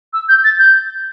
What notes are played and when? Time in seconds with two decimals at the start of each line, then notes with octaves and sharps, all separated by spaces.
0.13 E6
0.29 G6
0.44 A6
0.59 G6